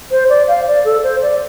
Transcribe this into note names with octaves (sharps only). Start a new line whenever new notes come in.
C5
D5
F5
D5
A4
C5
D5